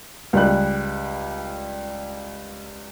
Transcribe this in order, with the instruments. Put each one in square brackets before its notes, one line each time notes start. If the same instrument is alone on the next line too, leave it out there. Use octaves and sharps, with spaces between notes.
[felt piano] C#2 G3 F#6